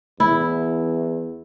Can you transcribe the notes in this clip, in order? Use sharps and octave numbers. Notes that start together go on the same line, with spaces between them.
E2 E4